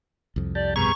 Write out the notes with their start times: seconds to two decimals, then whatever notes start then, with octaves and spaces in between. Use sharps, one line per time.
0.36 C2 F2
0.55 G4 D5 A5
0.76 G2 B2 G#4 A#5 C#6